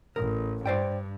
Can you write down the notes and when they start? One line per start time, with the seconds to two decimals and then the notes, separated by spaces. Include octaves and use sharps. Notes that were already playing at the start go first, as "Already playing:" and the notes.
0.16 A1 A#4
0.66 G2 C5 D5 G5